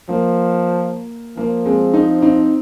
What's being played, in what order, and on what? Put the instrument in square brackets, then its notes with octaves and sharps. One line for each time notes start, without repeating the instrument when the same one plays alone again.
[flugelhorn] F3 [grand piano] A#3
[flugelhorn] F3 [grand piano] A#3
[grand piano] G#3 C4
C4 D#4
C4 D#4